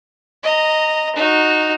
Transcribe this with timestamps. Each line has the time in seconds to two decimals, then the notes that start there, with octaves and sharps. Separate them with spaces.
0.43 D#5 A#5
1.16 D#4 F#4